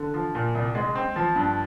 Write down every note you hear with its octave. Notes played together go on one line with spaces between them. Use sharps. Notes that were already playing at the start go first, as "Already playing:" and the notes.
Already playing: D3
F3
A#2
C2
G#3
C4
F3
G2